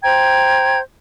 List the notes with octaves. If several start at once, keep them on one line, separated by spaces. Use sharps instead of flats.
C5 G5 A#5 G#6